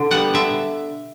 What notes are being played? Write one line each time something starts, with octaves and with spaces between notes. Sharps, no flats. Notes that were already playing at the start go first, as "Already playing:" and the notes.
Already playing: B2 D3
G3 B3 F#5
D3 E5